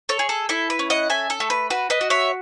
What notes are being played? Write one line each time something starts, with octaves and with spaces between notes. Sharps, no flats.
A4 C#5
G#4
A4
E4 A4
B4
C#4
D#5 F#5
A4 E5 G#5
A4
A3
B4
F#4 B4
B4 D#5
F#4
C#5 E5